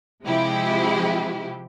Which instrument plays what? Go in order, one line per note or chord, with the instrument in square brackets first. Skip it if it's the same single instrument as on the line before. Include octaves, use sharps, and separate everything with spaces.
[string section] C3 F3 G#3 E4 G4